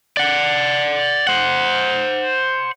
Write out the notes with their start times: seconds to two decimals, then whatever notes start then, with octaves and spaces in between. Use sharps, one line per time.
0.17 D5 F#5
1.27 C5 F#5